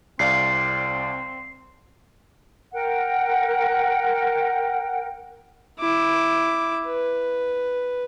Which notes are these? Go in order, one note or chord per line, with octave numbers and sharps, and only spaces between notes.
C2 C4 D5 F5 C7
A#4 F#5 G5
E4 D6
B4